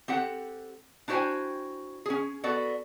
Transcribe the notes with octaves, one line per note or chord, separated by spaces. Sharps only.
C4 G4 A4 F#5
D4 E4 F#4 C5 G5 G#5
C#4 G#4
B3 F#4 A4 D5